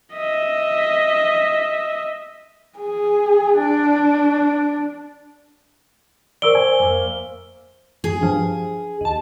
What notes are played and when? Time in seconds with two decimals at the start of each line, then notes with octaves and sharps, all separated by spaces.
0.14 D#5 E5
2.79 G#4
3.59 D4
6.42 A#4 C5 D5 C6 C#6 E6 D7 G7
6.55 G#5
6.80 F2 A#3 E5 F5
8.04 G#4
8.21 G2 F3
9.01 D#2 A5